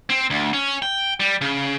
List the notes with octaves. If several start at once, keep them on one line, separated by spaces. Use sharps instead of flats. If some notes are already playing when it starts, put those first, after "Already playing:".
C4
D2
C#4
G5
G3
C#3